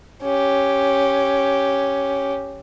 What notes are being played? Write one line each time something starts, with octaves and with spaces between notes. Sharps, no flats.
C#4 G4